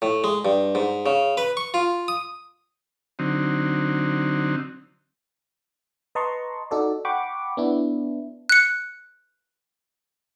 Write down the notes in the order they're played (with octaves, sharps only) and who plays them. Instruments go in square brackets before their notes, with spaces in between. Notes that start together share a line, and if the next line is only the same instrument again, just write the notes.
[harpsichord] A2
G#3
G2
G#2
C#3
B4
C#6
F4
D#6
[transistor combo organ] D3 F#3 C4 D#4
[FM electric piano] B4 D#5 A5 A#5 C6 C#6
D#4 F#4 A4 D5
F#5 G5 B5 C#6 D6
B3 D4 E4
[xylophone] F#6 C#7